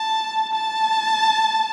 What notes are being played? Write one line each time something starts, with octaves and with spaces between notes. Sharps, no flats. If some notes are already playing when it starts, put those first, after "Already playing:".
Already playing: A5
A5